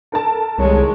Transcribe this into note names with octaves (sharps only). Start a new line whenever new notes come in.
A4 A#4 A5
C2 D#3 G#3 C#5